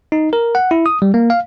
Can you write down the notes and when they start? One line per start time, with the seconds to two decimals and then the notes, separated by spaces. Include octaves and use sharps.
0.12 D#4
0.33 A#4
0.55 F#5
0.71 E4
0.86 D#6
1.02 G3
1.14 A#3
1.30 F5